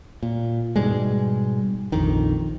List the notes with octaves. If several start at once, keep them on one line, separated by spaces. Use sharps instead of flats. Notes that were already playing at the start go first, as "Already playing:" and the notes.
A#2
G#2 B2 G3 G#3
A#1 F2 D#3